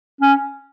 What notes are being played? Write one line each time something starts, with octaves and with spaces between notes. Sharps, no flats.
C#4